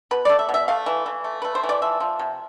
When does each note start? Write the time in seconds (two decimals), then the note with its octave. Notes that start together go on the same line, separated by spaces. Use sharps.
0.11 B2 B4
0.25 A3 D5
0.39 E5
0.49 B2
0.54 E5
0.68 A3 F5
0.86 E3
1.06 E3
1.24 A3
1.42 A3 B4
1.55 C5
1.63 E3
1.69 D5
1.82 F3 E5
2.00 F3
2.19 C3